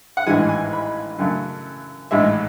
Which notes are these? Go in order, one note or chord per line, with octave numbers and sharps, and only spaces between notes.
F#5
A1 G#2 E3 G#3 G#5
G#5
B5
F#2 C#3 F#3 A3
A1 G#2 G#3 E5